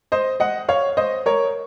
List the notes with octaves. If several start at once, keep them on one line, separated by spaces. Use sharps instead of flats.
C5 D#5
D#5 F#5
C#5 F5
C5 D#5
A#4 C#5